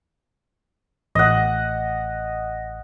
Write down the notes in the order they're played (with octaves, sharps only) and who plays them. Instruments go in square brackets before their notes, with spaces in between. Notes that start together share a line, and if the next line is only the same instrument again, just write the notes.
[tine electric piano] A1 [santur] D#5 F#5